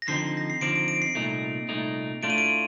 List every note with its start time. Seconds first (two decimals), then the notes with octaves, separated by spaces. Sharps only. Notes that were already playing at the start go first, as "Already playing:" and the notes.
0.02 A#6
0.08 D3 F3 C4 D#4 C7
0.37 A#6
0.50 C7
0.61 D3 F3 C4 D#4 D7
0.76 D7
0.88 D7
1.02 C7
1.15 C2 A#2 A3 D#4
1.69 C2 A#2 A3 D#4
2.23 A2 A3 D4 F4 D7
2.30 D#7
2.38 D7